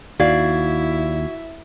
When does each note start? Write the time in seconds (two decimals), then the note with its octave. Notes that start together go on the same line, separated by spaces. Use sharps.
0.20 D#2 E4 F#4 D5 E5 F5 G#6